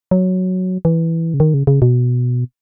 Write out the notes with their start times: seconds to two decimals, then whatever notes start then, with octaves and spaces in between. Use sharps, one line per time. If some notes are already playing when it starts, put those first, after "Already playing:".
0.11 F#3
0.85 E3
1.34 C#3
1.40 D#3
1.54 C#3
1.67 C#3
1.82 B2